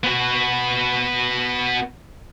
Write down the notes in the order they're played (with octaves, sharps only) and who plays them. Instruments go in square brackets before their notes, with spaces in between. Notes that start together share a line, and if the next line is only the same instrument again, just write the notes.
[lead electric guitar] B3 F#4